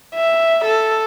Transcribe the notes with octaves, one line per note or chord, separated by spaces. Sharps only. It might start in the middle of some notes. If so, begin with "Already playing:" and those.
E5
A4